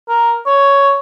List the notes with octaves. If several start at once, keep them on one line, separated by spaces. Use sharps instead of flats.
A#4
C#5